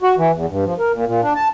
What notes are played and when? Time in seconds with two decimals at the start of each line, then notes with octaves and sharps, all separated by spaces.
0.03 F#4
0.18 E3
0.35 E2
0.49 G2
0.65 F3
0.79 A#4
0.93 A#2
1.06 A#2
1.23 D4
1.35 A5